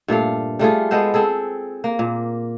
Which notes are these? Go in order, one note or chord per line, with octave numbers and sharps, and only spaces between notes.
G2 A#2 A3 F5
G3 A3 F4 G#4
G#3 B3 A4 C5
C4 G#4 A4
A#3
A#2